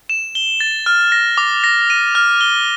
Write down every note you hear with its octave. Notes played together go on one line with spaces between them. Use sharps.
E7
G7
A6
F6
A#6
D6
A#6
D#7
F6
G7